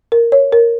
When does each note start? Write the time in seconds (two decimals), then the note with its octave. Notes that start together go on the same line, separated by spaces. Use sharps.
0.12 A#4
0.32 C#5
0.52 A#4